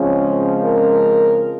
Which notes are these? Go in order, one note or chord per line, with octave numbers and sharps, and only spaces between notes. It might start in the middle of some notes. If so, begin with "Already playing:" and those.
Already playing: C#3 F3 G#3 C4 C#4
A#4